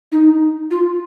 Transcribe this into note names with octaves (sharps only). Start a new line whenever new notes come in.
D#4
F4